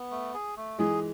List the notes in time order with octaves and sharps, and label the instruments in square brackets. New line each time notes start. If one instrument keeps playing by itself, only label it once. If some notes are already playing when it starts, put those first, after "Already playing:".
Already playing: [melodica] B3
A3
G#4
A3
[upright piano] E3 G#3 [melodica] G#4